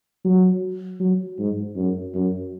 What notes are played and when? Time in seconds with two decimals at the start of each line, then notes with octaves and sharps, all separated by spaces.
0.24 F#3
1.00 F#3
1.39 G#2
1.76 F#2
2.14 F#2